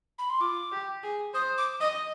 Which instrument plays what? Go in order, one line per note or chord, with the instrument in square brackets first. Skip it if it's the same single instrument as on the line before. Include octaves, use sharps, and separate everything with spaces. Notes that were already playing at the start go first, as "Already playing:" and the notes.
[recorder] B5
C6
[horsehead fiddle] F4 [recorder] D6
[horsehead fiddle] G4
G#4
[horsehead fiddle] C5 [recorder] D#6
[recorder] D6
[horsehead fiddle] D#5 [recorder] D#6